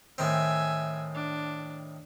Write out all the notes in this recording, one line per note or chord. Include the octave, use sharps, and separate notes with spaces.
A2 D#3 C4 E5 G#5
D4